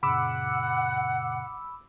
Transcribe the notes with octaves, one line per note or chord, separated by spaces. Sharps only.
F#2 A#2 C#3 F#5 B5 D6 E6